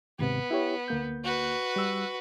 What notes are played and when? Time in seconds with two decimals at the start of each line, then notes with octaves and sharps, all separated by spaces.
0.19 D#2 G#2 C3 B3
0.51 E4 G4 C#5
0.88 D2 A#3 G6
1.24 F#4 B4
1.76 G3 E6